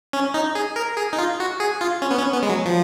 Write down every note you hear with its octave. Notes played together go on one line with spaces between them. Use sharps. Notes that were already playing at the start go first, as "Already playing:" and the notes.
C#4
D#4
G#4
A#4
G#4
D#4
F4
F#4
G#4
F4
C#4
B3
C#4
B3
G#3
F#3
F3